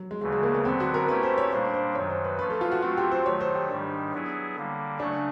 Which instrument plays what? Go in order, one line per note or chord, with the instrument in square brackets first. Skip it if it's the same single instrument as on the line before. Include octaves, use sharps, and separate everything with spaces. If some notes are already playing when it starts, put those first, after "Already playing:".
Already playing: [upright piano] F#3
G#3
[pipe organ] D2 C#3 E3 [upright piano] G#3
[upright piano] G#3
A#3
B3
[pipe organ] D3 F#3 B3 [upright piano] C4
[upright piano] F#4
A#4
[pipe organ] A3 C#4 E4 G4 [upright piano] B4
[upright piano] C5
C#5
[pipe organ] A#2 G3 A#3 D4 [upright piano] C5
[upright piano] C5
[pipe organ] F#2 D#3 F#3 [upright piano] C#5
[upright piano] C5
B4
[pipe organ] F3 A3 C#4 [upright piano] B4
[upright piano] A4
F4
F#4
[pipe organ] F#3 A3 C4 [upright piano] F4
[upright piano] G4
C5
[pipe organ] D#3 F#3 A3 [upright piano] C#5
[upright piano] C5
G4
[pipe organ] G#2 D#3 G3 [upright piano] D4
[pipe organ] F#3 B3 E4 G#4
D3 G3 A#3
[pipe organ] C#3 F#3 A3 C#4 [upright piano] D4